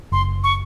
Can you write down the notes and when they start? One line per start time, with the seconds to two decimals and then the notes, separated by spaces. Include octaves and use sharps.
0.12 F#1 C6
0.44 C#6